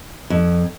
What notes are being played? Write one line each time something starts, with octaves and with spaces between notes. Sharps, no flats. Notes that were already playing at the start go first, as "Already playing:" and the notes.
F2